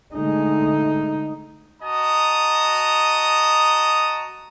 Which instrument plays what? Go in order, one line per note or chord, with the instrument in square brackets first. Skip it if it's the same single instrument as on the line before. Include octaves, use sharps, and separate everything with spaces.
[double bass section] D3 G#3 A3 [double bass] D#4
[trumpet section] F#4 D#5 A5 A#5 D#6